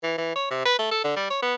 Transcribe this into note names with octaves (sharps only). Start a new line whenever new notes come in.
E3
E3
C#5
C3
B4
A3
A4
D3
G3
C#5
B3